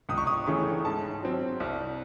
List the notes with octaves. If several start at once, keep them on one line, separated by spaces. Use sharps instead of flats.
C#2 D#6
C#6
D#6
C#3 E3 A3 C#4 C#6
G#2 A5
F#3 C4
C2